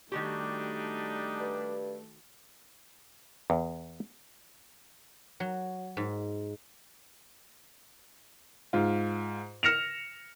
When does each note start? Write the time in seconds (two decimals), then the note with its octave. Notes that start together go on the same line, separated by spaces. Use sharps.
0.12 D#3 G3 A3 D4 D#4 F#4 G4
1.40 G2
3.50 E2
5.40 F#3
5.97 G#2
8.73 G#2 F4
9.63 F6 A#6 C#7 E7 F7